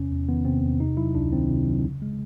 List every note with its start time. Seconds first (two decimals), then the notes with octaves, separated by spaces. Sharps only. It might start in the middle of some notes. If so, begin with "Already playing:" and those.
Already playing: E2 C3 C#4
0.12 E2
0.29 D#3 B3
0.45 C3 C4
0.62 E2
0.80 C3 D#4
0.97 F#3 E4
1.15 C#2 D4
1.33 D#3 C4
1.49 C3
1.67 F#3
1.84 C#3
2.02 G#3